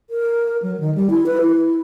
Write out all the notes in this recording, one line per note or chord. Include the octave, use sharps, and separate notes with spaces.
A#4
F#3
D#3
G3
E4
B4
E4